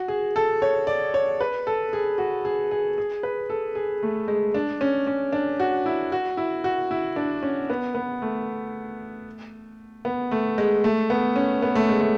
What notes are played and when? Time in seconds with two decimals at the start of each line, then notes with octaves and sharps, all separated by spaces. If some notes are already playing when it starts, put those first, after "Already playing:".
Already playing: F#4
0.08 G#4
0.36 A4
0.62 C#5
0.87 D5
1.14 C#5
1.41 B4
1.67 A4
1.93 G#4
2.18 F#4
2.45 G#4
2.71 G#4
2.98 G#4
3.23 B4
3.50 A4
3.75 G#4
4.03 A3
4.28 G#3
4.54 D4
4.81 C#4
5.07 C#4
5.33 D4
5.60 F#4
5.86 E4
6.12 F#4
6.37 E4
6.64 F#4
6.91 E4
7.16 D4
7.43 C#4
7.70 B3
7.95 B3
8.22 A3
10.05 B3
10.31 A3
10.58 G#3
10.84 A3
11.10 B3
11.36 C#4
11.62 B3
11.75 A3
11.89 G#3
12.01 A3